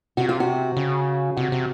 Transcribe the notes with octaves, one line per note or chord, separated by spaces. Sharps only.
C3 F#4
F4
F#4
C#3
C3 F#4
C3